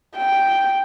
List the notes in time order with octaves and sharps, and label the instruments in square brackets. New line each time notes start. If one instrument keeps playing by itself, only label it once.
[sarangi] G5